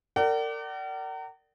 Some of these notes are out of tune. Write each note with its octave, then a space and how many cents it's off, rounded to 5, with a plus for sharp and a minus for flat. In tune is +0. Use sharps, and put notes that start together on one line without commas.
A#4 -35 D5 +0 F#5 +45